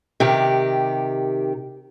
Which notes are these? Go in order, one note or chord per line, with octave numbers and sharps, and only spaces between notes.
C3 D#3 G4